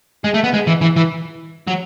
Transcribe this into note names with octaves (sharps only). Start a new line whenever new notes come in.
G#3
A3
B3
G#3
E3
E3
E3
F#3